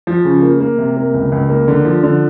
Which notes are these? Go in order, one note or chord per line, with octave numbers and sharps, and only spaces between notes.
F3
C#3
A#3
A#3
C3
A#3
C#2
C#2
A#3
D3
F3
D3